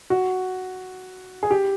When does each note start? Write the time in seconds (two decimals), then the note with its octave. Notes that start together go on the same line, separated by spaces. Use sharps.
0.10 F#4
1.43 G#4
1.51 G4